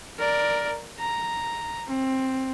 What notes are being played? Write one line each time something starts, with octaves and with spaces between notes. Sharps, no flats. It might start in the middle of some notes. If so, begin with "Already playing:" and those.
A#4 D5
A#5
C4